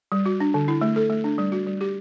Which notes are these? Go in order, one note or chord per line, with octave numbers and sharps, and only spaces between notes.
G3
F#4
D4
D3
E4
A3
A4
A3
D4
G3
F#4
G3
G4